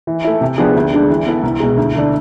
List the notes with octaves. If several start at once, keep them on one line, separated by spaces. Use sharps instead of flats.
E3
A3 E4
C3
F3 B3 D4 G#4
D2
D3 G#3 D4
E3
B3 E4 A4
C2
B2 G#3
D2
D3 A3 D4